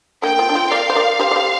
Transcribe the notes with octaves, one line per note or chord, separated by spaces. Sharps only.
A#3 D4 G5
C4 F4
D4
C4 F4
A#4 D5 F5
C5
A#4 D5
G4 C5
D5
G4 C5